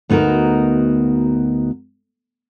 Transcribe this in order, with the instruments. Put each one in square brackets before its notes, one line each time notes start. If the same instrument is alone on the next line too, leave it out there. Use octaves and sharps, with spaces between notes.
[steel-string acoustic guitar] D2 B3 D#4 F#4 A#4